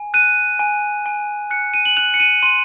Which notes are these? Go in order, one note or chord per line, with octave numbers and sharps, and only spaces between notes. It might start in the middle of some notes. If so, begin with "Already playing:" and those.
Already playing: G#5
F#6 D#7
G#5
G#5
F#6 C#7
D#7
F#7
F#6 F7
C#7
D#7
C6 D#7